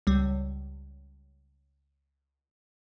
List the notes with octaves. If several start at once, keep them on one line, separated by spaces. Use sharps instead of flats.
C#2 G3